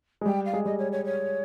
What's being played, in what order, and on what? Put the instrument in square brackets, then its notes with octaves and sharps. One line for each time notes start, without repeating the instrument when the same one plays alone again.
[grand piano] G#3
[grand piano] G3 [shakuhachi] G5
[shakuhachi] F5
[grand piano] G#3
[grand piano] G3 [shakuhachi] D#5
[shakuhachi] C#5
C#5
C#5